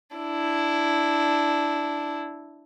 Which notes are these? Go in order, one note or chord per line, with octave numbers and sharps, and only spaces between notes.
D4 E4